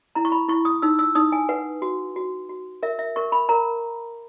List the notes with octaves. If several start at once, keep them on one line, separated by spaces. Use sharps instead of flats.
E4 A#5
C#6
B5
E4 C#6
D#6
D#4 E6
E6
D#4 D#6
G#5
B4 F#5
F#4
F#4
F#4
A#4 E5
E5
A#4 C#6
B5
A#4 A#5